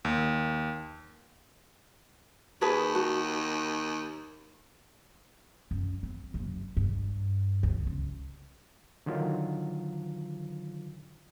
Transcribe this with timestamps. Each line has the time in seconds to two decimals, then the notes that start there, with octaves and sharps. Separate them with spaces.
0.05 D#2
2.62 D#2 G#4 B4 A5
2.95 F#4
5.71 F#2
6.03 C4
6.34 F#1
6.77 G2
7.63 D2
7.87 C#2
9.06 D3 D#3 F#3 F4